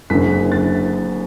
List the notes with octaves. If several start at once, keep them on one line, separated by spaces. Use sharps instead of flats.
F#1 F#2 D3 B6
A6